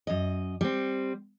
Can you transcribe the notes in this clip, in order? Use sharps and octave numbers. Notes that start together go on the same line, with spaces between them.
F#2 D#5
G3 C4